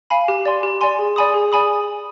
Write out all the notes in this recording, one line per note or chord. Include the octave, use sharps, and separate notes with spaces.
F5 G#5 B5
G4
D5 G#5 C6
G4
D5 G#5 C6
G#4
D5 G#5 B5 D#6
G#4
D5 G#5 B5 D#6